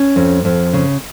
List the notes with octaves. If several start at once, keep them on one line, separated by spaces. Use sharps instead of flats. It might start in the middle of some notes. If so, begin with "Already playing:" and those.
Already playing: C#4
F2
F2
C#3